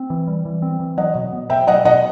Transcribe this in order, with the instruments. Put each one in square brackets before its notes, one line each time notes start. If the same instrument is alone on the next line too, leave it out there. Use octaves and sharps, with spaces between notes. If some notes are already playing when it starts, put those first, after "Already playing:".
Already playing: [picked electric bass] C4
E3
G3
E3
C4
E3
[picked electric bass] F#3 [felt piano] D#5 F#5
[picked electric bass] B2
B3
[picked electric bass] B2 [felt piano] E5 G5
[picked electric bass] F#3 [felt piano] D#5 F#5
[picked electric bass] B2 [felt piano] D#5 F#5